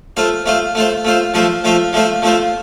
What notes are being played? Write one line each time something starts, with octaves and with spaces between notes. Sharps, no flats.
A3 F4 C5
A3 F4 C5
A3 F4 C5
A3 F4 C5
F3 A3 F4 C5
F3 A3 F4 C5
F3 A3 F4 C5
F3 A3 F4 C5